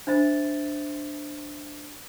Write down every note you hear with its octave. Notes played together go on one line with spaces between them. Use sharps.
D4 C5 E5 B5 A6